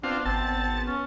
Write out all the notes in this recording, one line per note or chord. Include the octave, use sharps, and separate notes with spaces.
B3 C4 D4 F4
G#1 C4 A5
C#4